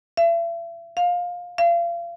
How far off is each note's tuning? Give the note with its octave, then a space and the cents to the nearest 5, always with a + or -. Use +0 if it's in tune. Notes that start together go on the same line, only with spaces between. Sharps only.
E5 +40
F5 +20
F5 -35